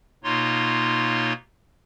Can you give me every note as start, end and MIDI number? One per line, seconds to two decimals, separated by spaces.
0.24 1.33 47
0.24 1.33 58
0.24 1.33 63
0.24 1.33 65
0.24 1.33 73
0.24 1.33 84